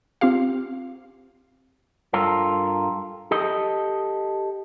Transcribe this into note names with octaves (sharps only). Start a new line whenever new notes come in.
C4 F4 G4 F5
G2 F4 A4 A#4
G4 A4 D#5